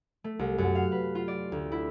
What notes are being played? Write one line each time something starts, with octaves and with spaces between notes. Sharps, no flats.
A3
C2
F#2
F5
B4
F4
D5
D2
E4